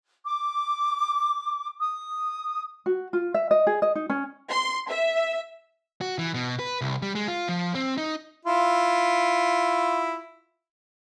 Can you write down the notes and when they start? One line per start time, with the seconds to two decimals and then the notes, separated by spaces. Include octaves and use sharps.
0.24 D6
1.78 D#6
2.86 F#4
3.13 F4
3.34 E5
3.51 D#5
3.67 G#4
3.82 D#5
3.95 D#4
4.10 C#4
4.50 C6
4.89 E5
6.01 F#4
6.19 E3
6.34 B2
6.59 B4
6.81 C2
7.02 G3
7.15 G#3
7.28 F4
7.49 F3
7.75 C4
7.98 D#4
8.45 E4 F4